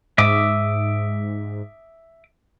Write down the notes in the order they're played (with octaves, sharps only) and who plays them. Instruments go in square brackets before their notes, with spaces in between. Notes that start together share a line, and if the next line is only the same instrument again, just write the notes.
[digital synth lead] G#2 [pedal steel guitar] E5 D6 D#6